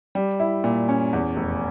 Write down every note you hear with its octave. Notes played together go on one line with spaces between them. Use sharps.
G3
E4
A#2
C#4
E2
F1